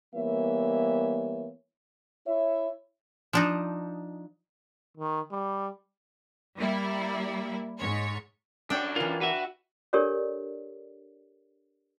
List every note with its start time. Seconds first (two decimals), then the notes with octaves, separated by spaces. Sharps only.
0.15 E3 G3 A#3 B3 C#5 E5
2.27 E4 C#5 E5
3.33 F3 D4 D#4
4.97 D#3
5.31 G3
6.58 G3 A#3 E4
7.79 G#2 C#5
8.70 F#2 D4 C#5 G5
8.96 E3 F4 A#4
9.21 F#4 B4 E5
9.93 D4 G4 A4 A#4 C#5 D5